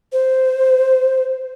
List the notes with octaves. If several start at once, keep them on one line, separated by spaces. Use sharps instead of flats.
C5